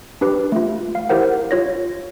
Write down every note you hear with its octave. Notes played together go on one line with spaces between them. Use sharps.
D4 G4 B4
A3 F4
F5
E4 G4 A#4 C5 F#5
F4 C#5 A#6